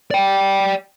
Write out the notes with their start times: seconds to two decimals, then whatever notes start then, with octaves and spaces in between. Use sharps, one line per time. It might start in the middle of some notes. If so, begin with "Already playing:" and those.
0.11 D5 G5